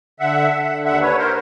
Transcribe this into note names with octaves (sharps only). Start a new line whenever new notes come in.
D3 E5 F#5
D3
D#2 E5 F#5
B4 C#5
A#4 C5